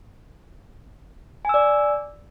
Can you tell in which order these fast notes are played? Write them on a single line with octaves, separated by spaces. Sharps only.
G#5 E6 D5